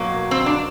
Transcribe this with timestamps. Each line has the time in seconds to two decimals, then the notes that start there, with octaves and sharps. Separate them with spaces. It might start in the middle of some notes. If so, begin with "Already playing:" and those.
Already playing: B2 F#3 A#3
0.31 C4
0.46 D4